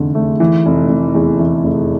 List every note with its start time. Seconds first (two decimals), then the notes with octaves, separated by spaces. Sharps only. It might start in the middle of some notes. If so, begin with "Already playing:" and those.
Already playing: F1 E2 D3
0.15 A3
0.40 E3
0.66 F1
0.89 F1
1.15 E2
1.39 E3
1.64 F1